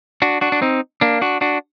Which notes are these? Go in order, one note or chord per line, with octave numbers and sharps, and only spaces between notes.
D4 F#4
D4 F#4
D4
C4 D#4
A#3 D4
D4 F#4
D4 F#4